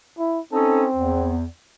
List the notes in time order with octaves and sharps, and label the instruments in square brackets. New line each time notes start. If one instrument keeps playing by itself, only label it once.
[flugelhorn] E4
[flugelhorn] C4 [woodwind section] C#4 D#4 A4
[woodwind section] E2